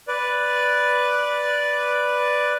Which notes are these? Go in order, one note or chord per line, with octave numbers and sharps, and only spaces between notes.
B4 D5